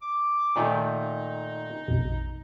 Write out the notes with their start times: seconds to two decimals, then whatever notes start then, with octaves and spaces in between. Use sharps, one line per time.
0.02 D6
0.56 A#2 D#3 A3 D#4
1.88 A#1 F2 B2